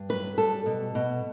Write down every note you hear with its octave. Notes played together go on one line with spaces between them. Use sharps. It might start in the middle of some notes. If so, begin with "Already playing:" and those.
Already playing: G2
F#3 B4
G3 A4
B2
B2